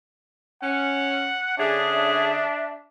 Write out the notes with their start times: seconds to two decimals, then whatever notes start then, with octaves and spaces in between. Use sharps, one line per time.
0.62 C#4 F#5
1.58 D3 C#4 D4 G#4 E5